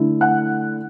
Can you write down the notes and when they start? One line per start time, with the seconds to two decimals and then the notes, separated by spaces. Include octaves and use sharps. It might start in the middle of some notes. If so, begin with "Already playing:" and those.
Already playing: D3 A3 E4
0.21 F#5 F#6